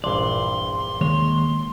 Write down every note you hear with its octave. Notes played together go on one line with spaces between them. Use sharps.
A#1 G2 E3 D5 C6
D#2 G#3 C#5